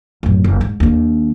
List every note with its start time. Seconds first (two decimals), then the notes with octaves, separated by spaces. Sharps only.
0.23 D1 F#2
0.44 F#1
0.61 G#2
0.80 D#2 D4